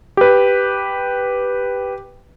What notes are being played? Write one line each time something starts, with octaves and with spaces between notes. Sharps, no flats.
G4 B4